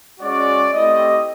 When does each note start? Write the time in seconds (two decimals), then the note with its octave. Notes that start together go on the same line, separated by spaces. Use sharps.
0.20 G#3 C#4 F#4 D5
0.72 A3 C4 E4 G4 D#5